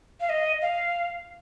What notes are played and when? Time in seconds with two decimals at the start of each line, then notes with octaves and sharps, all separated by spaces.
0.21 F5
0.29 D#5
0.62 F5